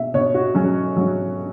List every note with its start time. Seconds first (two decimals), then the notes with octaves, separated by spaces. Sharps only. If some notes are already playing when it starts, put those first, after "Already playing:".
Already playing: B2 E5
0.14 B2 C#5
0.34 F#4
0.55 F#3 C#4
0.97 F#3